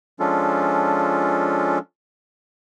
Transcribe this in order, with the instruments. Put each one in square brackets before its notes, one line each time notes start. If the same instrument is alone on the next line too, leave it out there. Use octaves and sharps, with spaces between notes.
[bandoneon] F3 G#3 C#4 D4 F4 A4